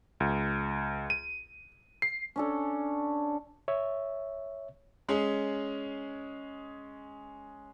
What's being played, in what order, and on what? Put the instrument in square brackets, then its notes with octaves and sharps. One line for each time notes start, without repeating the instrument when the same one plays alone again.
[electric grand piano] C#2
D#7
C7
[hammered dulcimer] C#4 D4 A4
[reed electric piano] C#5 E5
[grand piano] G#3 C#4 G#4